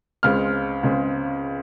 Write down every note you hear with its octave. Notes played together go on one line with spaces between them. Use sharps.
C#2 C#3 G#3 C4 F6
C#2 C#3 G#3 C4